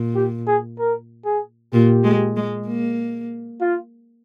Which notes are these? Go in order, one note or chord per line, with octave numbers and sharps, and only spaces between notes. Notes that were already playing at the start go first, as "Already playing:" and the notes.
Already playing: A#2
G4
G#4
A#4
G#4
A#2 G4
G#3
G#3
A#3
F4